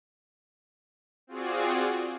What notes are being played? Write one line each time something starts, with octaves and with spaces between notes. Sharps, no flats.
C4 F4 F#4 G#4 D5